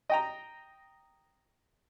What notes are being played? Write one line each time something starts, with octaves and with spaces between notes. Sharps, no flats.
D#5 G5 A#5